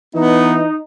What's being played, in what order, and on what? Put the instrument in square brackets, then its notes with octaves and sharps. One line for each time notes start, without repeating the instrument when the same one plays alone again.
[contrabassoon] E3 [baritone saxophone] B3 [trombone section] D#4